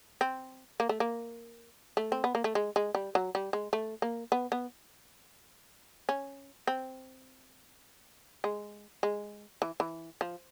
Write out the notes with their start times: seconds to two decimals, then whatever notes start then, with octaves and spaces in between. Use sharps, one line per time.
0.21 C4
0.80 A#3
0.89 A3
1.00 A#3
1.97 A3
2.12 C4
2.24 B3
2.35 A#3
2.44 A3
2.55 G#3
2.76 G#3
2.95 G3
3.15 F#3
3.35 G3
3.53 G#3
3.73 A3
4.02 A#3
4.32 B3
4.52 B3
6.09 C#4
6.67 C4
8.44 G#3
9.03 G#3
9.62 E3
9.80 E3
10.21 F3